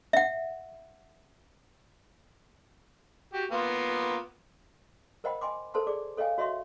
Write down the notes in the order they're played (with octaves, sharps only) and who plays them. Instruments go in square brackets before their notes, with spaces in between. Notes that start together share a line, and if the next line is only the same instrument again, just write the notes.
[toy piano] E5 F#5
[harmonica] F#4 G4
A#3 B3 F4
[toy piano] A#4 C5 D#5 F#5 G5 B5
D#5 G5 G#5 C6 D6
A4 A#4 C5 A5 C6
G#4 D5 D6
A4 C#5 D#5 F5 G5 G#5
F#4 C#5 D#5 E5 C6 C#6